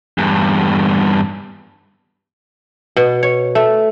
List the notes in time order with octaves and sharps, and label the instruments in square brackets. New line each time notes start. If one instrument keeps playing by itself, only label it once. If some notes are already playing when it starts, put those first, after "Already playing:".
[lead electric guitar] E2 G2
[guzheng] B2
C#5
A3